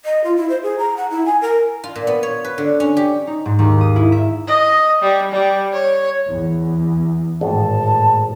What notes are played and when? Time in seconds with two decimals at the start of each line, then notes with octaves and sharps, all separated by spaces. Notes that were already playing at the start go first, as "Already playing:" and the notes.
0.05 D#5
0.24 F4
0.36 E4
0.49 C5
0.63 G#4
0.78 A#5
0.97 F#5
1.11 E4
1.25 G#5
1.41 A#4
1.84 F4
1.95 A#2
2.07 B3
2.23 C#5
2.44 B4
2.58 D3
2.80 C#4
2.97 G4
3.27 D#4
3.45 G#2
3.59 D#2
3.81 D#6
3.96 E4
4.12 E5
4.47 D#5
5.02 G3
5.32 G3
5.72 C#5
6.29 E2
7.41 G#1 A2 A5